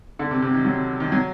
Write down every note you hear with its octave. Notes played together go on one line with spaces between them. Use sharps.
D3
C3
C3
D#3
F#3
D#3
F#3